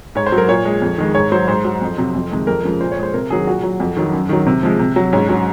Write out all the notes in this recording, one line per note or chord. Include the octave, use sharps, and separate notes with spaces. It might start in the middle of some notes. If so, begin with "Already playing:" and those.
G#2 C#5
C5
F#3
A#4
A#2 C#5
G#3
F2
D#3 G#3
G#2 C#5
F#3 C5
G#2 C5
F#3
F2
C3 F#3
F2
C3 D#3 G#3
F2 A#4
C#3 F3 G#3
A#2 C5
C#5
G#3
C5
C3 A#4
D#3 F#3 G#4
A#2 F#4
F#3
F2
D#3 F#3
F#2
D#3 F#3
C3
F3 G#3
C3
F#3
G#2 C#4
F#3 C#4